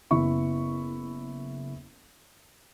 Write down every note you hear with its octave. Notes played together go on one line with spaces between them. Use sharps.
F#1 B3 E4 C#6